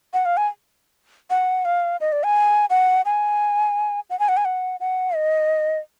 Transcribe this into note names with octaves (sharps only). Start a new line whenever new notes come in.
F#5
F5
G#5
F#5
F5
D#5
D5
G#5
F#5
G#5
F#5
G#5
F#5
G#5
F#5
F#5
D#5